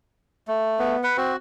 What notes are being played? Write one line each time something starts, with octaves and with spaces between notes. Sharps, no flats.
A3
B3
B4 F#5
C4 F#4